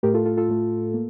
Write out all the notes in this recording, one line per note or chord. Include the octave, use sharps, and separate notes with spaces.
A2 A3 G4 A#4
F4 A4
F4 A4
F4 A4
A2 A3
A#3